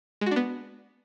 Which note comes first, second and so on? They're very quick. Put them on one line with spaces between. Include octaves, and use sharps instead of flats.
G#3 F#4 D4 B3